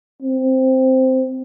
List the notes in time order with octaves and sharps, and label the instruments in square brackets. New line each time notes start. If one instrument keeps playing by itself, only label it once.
[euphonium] C4